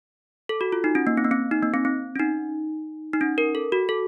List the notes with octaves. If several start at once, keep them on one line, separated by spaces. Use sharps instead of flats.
A4
F#4
F4
D#4
C#4
A#3
C4
A#3
C4
D#4
A#3
C4
C4
C#4
D#4
D#4
C#4
A#4
A4
F#4
A4